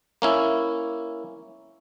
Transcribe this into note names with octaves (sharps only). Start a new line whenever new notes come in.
A#3 C#4 E4